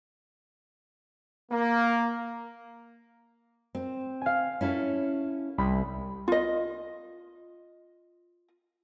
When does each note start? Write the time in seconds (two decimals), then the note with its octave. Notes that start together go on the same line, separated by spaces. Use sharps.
1.52 A#3
3.75 C4
4.21 F5 G#5
4.61 C#4 E4 A4
5.58 C2 B5
6.28 F4 D#5